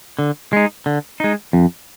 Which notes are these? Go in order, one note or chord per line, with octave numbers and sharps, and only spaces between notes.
D3
G#3 D#4
D3
G#3 D#4
F2